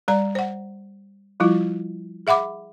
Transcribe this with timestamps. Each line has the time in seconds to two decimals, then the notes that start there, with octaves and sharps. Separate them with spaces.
0.08 G3 D5 A#5
0.35 C5 F#5
1.40 F3 G3 E4 F4
2.27 G#4 E5 F#5 B5 D6